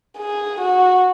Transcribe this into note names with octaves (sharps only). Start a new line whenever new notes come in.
G#4
F#4